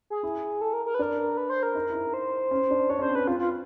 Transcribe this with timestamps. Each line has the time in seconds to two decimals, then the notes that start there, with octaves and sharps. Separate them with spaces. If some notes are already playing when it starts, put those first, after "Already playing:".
0.10 G#4
0.23 E4
0.61 A4
0.73 A#4
0.86 A#4
0.94 B4
0.99 D4 A#4
1.37 B4
1.50 C5
1.63 A#4
1.75 D#4
1.90 E4
1.95 D#4
2.14 C5
2.51 C#4
2.71 D4
2.89 D4 C#5
2.99 C#4
3.02 C5
3.09 C4
3.15 C#4 B4
3.27 C4 F4
3.40 F4